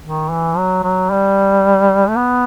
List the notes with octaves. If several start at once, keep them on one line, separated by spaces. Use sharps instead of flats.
D#3
E3
F#3
F#3
G3
A3
B3